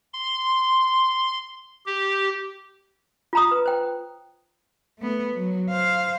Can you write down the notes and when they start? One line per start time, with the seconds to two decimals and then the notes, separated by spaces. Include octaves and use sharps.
0.13 C6
1.86 G4
3.33 F4 A#5 D#6
3.51 B4
3.66 C5 G5
4.99 A3 B3
5.35 F#3
5.70 C5 F5